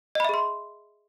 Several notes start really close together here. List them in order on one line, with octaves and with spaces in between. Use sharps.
D#5 B5 E5 G#4 C6